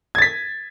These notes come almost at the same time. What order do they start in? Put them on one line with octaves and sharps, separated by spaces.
G#6 A6 B6